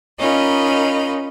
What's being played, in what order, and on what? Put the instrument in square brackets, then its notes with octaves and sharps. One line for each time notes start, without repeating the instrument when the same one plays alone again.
[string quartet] C#4 D#4 F4 A#4 D#5 B5